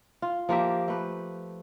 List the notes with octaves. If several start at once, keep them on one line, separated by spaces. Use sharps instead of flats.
F4
F3 A#3 G4 E5
A3 B4